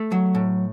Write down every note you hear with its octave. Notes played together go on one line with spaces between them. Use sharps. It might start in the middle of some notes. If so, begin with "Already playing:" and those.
Already playing: A3
F#3
A2